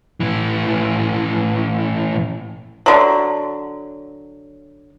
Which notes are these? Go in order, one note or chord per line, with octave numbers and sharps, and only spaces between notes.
A2 E3
D3 F#3